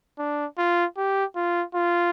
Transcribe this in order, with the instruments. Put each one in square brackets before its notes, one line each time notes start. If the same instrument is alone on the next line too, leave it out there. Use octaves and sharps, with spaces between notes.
[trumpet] D4
F4
G4
F4
F4